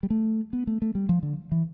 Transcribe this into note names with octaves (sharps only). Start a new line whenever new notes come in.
G3
A3
B3
A3
A3
G3
F3
D3
E3